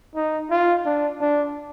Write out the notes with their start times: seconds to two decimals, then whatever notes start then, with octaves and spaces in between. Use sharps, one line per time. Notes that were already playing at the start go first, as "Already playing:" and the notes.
0.15 D#4
0.50 F4
0.85 D4
1.21 D4